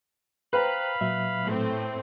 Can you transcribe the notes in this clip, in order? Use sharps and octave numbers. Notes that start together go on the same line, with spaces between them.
B4 C5 F5 G5 A#5 B5
A#2 F#3 E5
A2 A3 C4